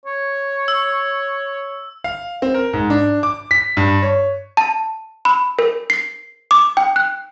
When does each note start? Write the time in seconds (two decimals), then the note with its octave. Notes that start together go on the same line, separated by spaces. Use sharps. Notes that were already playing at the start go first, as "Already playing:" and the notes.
0.06 C#5
0.68 E6
2.04 F5
2.42 C4
2.54 A#4
2.73 G#2
2.90 D4
3.23 D6
3.51 B6
3.77 G2
4.02 C#5
4.57 A5
5.25 B5
5.59 A#4
5.90 C7
6.51 D6
6.77 G5
6.96 F#6